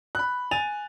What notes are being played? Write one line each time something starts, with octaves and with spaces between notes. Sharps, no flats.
B5 F#6
G#5 A6 D#7 F7